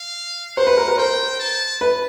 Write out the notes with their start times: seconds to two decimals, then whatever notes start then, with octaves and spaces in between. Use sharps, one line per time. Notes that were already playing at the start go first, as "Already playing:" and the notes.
Already playing: F5
0.57 C5 F#5
0.67 B4
0.77 A#4
0.88 A#4
0.98 C5 G5
1.40 A5
1.81 B4